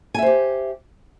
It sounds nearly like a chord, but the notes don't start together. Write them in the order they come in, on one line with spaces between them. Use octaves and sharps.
G#5 E5 C5 G4